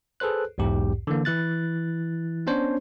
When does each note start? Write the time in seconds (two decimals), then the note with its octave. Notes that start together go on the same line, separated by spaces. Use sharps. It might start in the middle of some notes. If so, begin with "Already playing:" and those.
0.20 G#4 A4 B4 C5 F#6
0.58 B1 E2 G#2 G4
1.07 D3 E3 A#3
1.25 E3 E4 F#6 A6
2.47 B3 C#4 D4 C5 C#5